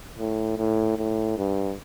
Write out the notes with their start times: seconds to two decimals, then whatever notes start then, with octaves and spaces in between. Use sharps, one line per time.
0.19 A2
0.58 A2
0.98 A2
1.38 G2